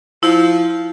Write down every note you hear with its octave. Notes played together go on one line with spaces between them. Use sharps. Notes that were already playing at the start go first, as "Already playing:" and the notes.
F3 E4